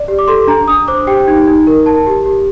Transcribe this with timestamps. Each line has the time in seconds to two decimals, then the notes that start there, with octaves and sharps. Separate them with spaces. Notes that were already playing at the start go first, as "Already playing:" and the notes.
Already playing: D5
0.08 G4
0.19 D6
0.28 A4 C6
0.47 D4 A#5
0.68 D4 D#6
0.88 C5 D6
1.07 G4 G5
1.28 D#4
1.47 D#4
1.67 A#4
1.86 A#4 A5
2.07 G4
2.26 G4